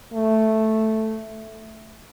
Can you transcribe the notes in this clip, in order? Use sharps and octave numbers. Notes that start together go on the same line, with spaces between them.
A3